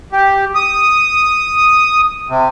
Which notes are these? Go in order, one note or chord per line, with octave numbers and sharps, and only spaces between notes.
G4
D#6
C3